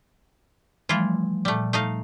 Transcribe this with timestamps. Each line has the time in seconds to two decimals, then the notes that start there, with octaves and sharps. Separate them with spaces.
0.89 E3 F3 G3 A3 E4 F4
1.45 A#2 G3 A3
1.73 A3 D#4 F5